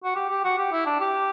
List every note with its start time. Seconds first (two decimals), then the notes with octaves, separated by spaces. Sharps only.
0.04 F#4
0.15 G4
0.29 G4
0.44 F#4
0.58 G4
0.72 E4
0.86 D4
1.00 G4